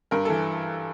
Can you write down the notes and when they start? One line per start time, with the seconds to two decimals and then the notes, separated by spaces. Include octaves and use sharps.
0.11 G2 A#4
0.25 E3 A4